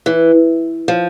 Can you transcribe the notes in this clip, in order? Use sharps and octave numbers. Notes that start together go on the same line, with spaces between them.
E3
F3